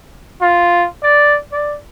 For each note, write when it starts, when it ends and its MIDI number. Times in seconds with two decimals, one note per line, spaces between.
0.41 0.87 65
1.03 1.37 74
1.52 1.76 74